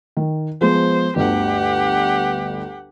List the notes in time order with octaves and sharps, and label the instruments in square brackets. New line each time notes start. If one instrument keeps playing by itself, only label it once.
[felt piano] D#3
[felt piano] F3 G#3 B3 [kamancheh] C5
[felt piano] G1 D2 [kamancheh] G4 F#5